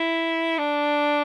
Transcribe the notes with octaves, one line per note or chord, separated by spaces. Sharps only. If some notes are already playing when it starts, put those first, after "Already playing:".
Already playing: E4
D4